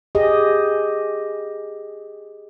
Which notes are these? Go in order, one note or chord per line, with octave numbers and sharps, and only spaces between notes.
G4 G#4 D#5